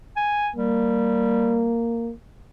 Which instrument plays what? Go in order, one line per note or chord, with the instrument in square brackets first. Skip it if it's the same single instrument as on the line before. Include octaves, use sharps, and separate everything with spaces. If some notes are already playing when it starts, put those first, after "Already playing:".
[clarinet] G#5
[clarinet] G3 [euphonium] A#3